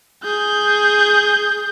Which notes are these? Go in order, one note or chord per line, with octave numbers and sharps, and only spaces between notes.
G#4 G6